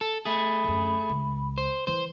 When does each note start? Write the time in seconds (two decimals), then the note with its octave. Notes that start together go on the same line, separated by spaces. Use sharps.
0.01 A4
0.25 A3 G#4 B5
0.64 D1 F#2
1.09 C#2
1.58 C5
1.87 E3 E4 C5